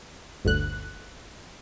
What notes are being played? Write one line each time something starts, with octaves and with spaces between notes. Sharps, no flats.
G1 D2 F#6